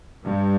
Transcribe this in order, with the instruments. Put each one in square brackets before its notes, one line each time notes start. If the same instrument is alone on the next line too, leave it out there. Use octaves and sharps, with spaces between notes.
[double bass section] G2